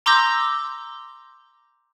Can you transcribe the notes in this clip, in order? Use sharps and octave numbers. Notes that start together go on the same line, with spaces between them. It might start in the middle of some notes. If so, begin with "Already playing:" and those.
A#5 C6 D6 E6 G6 A#6